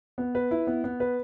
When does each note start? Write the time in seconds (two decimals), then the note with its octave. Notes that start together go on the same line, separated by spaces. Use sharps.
0.18 B3
0.35 B4
0.51 E4
0.67 B3
0.84 B3
1.00 B4